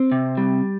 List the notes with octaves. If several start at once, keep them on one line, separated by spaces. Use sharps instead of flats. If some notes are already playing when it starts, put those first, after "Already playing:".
Already playing: C4
C3
G3